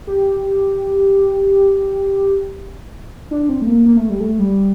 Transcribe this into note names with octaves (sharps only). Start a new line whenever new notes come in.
G4
D4
C4
A3
A#3
A#3
A3
G3
A3
G3